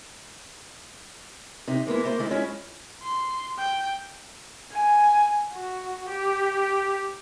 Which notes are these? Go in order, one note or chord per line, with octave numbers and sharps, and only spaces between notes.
C3 D#4
G#3 A#3 B3 E4
A3 A#3 C5
D#3 G#3 A3 E4 D#5
G#3 C#4 E4 F4 C#5
C6
G5
G#5
F#4
G4